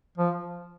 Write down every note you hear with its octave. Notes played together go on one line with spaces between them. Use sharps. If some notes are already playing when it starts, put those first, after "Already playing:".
F3